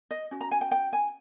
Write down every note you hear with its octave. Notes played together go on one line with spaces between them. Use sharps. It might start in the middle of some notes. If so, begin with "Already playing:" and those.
D#5
C#4 F#4
A#5
G#5
G5
G5
G#5